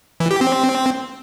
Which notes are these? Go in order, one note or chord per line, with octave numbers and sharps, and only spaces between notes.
E3
G4
C4